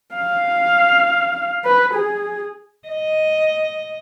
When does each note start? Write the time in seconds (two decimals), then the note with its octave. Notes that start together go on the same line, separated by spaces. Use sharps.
0.15 F5
1.65 B4
1.94 G#4
2.88 D#5